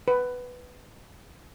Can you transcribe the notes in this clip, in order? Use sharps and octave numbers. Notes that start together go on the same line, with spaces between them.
B4